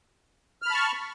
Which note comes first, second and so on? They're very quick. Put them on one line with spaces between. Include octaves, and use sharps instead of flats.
F6 B5 A5 C#6